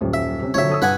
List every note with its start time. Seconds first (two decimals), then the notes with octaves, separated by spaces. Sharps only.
0.01 D#1 F#2 G3
0.14 E5
0.42 C3 C#4
0.54 A#1 D3 F#3 C#5 E5
0.69 A4 D#6 E6
0.82 G2 B4 F#5 G#5